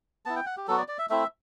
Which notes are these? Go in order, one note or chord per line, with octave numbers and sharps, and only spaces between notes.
B3 E4 A5
G5
F#5
G4
F#3 B3 F#4 A4
D5
D5
E5
A3 C4 E4 E5